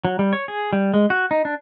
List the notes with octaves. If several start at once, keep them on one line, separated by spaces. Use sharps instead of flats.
F#3
G3
C#5
G#4
G3
G#3
F#4
D#4
D4